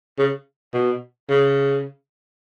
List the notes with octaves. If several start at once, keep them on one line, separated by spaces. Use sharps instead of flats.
C#3
B2
C#3